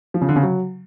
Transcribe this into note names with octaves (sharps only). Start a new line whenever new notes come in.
F3
C#3
D3
C#3
F#3